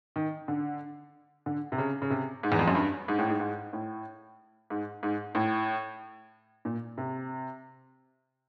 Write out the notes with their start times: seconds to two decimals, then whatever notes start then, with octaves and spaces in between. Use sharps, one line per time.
0.16 D#3
0.48 D3
1.46 D3
1.72 C3
1.78 C#3
2.02 C#3
2.10 C3
2.43 G#2
2.52 E2
2.59 F2
2.68 F#2
2.75 G2
3.08 G#2
3.19 A2
3.29 G#2
3.40 G#2
3.73 A2
4.70 G#2
5.03 G#2
5.35 A2
6.65 A#2
6.98 C3